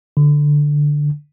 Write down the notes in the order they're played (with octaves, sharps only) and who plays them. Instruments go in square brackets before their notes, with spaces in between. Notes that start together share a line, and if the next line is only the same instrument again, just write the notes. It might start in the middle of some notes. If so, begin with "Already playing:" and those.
[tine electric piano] D3